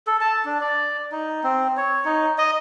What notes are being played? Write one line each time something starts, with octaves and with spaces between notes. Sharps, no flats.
A4
A5
D4
D5
D#4
C4
C#5
D#4
D#5